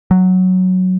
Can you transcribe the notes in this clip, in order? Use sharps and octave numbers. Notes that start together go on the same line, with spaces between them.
F#3